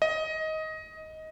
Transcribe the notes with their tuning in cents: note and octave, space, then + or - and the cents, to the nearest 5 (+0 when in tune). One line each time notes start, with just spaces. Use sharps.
D#5 +15